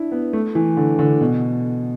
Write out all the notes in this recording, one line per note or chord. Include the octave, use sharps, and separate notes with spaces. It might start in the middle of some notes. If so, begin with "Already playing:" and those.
Already playing: D4 E4
B3
A3
E3
D3
D3
B2